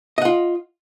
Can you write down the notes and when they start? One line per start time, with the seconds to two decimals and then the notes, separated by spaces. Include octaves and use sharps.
0.18 D#5
0.21 F#5
0.25 F4